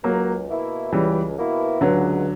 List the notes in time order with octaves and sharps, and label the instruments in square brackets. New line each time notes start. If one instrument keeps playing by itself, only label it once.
[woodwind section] C#2 [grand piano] F#3 A#3
[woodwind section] B2 A#3 E4
[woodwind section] C#2 [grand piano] E3 G3
[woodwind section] B2 A#3 E4
[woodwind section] C#2 [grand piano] D3 F#3